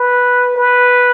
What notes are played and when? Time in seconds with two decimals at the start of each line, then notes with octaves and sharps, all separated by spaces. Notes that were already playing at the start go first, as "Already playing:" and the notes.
Already playing: B4
0.56 B4